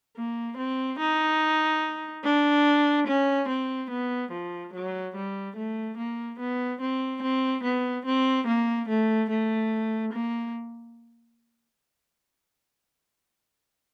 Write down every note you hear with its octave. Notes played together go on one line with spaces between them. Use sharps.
A#3
C4
D#4
D4
C#4
C4
B3
F3
F#3
G3
A3
A#3
B3
C4
C4
B3
C4
A#3
A3
A3
A#3